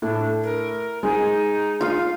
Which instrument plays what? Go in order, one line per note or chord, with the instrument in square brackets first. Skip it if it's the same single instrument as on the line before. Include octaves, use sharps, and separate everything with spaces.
[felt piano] A2 [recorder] D4
[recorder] A#4
[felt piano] G#3 [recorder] D#4
[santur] F4 F5